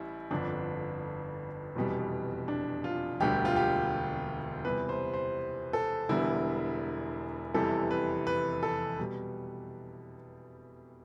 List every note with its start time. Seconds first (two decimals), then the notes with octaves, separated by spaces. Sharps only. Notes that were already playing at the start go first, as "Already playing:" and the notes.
Already playing: A1 G3 E4
0.31 G1 F2 D3 D4
1.75 F1 E2 B2 G3
2.48 D4
2.84 F4
3.20 E1 D2 D3 G3 G4
3.45 F4
3.56 G4
4.65 E2 C3 G3 B4
4.89 C5
5.14 C5
5.73 A4
6.09 E1 E2 D3 G3 E4
7.54 F1 E2 C3 E3 G3 A4
7.91 B4
8.27 B4
8.63 A4
8.99 B2 G3